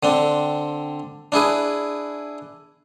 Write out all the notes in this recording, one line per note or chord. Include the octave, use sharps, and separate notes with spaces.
D3 C4 D4
D4 E4 G#4 B4